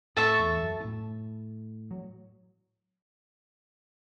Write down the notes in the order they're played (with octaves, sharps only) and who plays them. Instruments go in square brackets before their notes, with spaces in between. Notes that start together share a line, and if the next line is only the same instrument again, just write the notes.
[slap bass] A2 [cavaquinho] A4 E5 A5 C#6
[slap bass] E2
F#2
A2
F#3